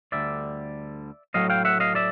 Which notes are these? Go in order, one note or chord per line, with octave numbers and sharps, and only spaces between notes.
D2 D3 G3 D5 E5
A2 F#3 A3 D#5 F5
F5 G5
E5 F#5
D#5 F5
D5 E5